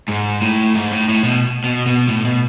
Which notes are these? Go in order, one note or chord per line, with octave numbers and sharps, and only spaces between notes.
G#2
A2
G#2
A2
A2
B2
B2
B2
A2
B2